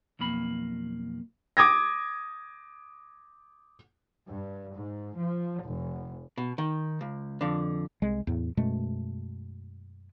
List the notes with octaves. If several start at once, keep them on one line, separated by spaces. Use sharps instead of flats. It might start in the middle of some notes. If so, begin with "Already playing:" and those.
B1 F2 A#3 B5
D6 D#6 G#6 A#6
G2
G#2
F3
F1
B2
D#3
C#2
F2 D3
C2 G#3
E2 A2
F#2 B2 G#3 A3